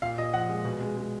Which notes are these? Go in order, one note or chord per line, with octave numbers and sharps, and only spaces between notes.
A#2 F5
A#2 D#5
F3 F#5
G#3
B2
G#3
G#3